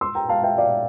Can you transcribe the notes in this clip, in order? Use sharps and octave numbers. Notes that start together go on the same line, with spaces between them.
C6 E6
G5 A#5
F5 A5
E5 G5
D5 F5